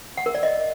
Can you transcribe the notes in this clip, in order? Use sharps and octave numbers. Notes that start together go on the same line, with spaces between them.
F#5
A#4
D5
D#5